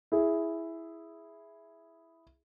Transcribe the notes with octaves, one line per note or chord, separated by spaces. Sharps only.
E4 G#4